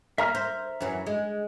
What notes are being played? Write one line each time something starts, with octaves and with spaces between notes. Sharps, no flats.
A#3 E5 A#5 F6
C5
F#2 E3 F#3
G#3